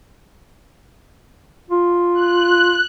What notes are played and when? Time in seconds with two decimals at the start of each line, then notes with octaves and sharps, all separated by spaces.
1.70 F4
2.14 F#6